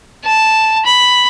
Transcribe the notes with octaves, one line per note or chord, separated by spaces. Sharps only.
A5
B5